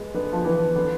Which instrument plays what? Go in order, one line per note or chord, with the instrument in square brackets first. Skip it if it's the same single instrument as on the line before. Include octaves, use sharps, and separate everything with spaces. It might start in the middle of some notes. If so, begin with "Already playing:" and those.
Already playing: [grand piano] G#3 B3
[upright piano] D3 [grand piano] B3
[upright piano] F3
[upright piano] E3 [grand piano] B3
[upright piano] D3 [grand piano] B3